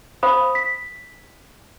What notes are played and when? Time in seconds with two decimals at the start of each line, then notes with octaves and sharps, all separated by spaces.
0.23 C5 F5 B5 D#6
0.55 B6